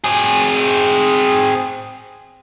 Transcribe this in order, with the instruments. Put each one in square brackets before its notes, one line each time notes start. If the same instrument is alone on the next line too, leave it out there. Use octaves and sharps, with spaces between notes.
[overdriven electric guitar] C4 G#4